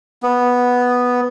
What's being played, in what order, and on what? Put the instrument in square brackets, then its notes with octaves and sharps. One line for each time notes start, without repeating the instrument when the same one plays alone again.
[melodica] B3